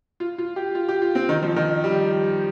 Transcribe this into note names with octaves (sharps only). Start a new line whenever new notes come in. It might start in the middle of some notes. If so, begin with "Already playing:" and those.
F4
F4
G4
F4
G4
F4
C4
D#3
F3
D#3
G3